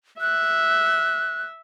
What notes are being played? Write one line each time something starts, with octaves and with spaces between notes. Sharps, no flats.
E5 F#6